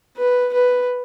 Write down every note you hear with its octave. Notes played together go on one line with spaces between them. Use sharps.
B4
B4